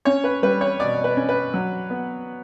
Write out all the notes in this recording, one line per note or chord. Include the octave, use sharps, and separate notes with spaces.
C#4 C#5
B4
G3 B4
C#5
B2 D5
B4
C#4
B4
F#3
B3